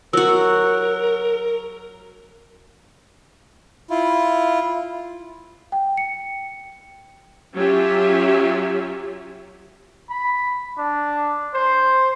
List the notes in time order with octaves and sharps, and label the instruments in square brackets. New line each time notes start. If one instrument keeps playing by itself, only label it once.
[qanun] F#3 F#4 [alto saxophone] A#4 [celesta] E6
[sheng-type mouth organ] E4 F4
[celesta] G5
C#7
[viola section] F#3 C#4 F4 G4 E5
[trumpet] B5
D4
C5